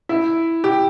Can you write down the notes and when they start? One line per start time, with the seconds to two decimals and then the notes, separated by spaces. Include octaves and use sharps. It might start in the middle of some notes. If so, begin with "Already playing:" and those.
0.09 E4
0.64 G4